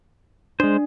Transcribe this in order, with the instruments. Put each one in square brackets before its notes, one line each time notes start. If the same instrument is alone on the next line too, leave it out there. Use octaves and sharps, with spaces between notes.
[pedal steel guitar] G#3 C5 [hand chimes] D4